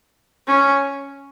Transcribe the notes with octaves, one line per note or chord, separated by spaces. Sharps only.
C#4